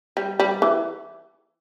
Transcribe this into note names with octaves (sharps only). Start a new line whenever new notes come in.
G3
G3
E3